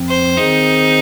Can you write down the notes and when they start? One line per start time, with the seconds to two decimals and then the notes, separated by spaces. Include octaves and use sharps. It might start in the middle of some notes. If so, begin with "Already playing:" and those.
Already playing: F2 F3 C4
0.09 C5
0.37 D#3 C4 D#4 G#4 C5